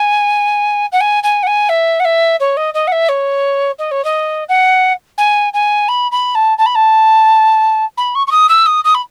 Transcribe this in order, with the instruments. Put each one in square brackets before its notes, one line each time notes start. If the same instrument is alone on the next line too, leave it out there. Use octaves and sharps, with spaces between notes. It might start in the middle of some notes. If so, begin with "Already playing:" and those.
Already playing: [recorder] G#5
F#5
G#5
G#5
F#5
G#5
E5
F#5
E5
C#5
D#5
D#5
F#5
E5
C#5
D#5
C#5
D#5
F#5
G#5
G#5
B5
B5
A5
A5
B5
A5
B5
C#6
C#6
D#6
E6
D#6
D#6
B5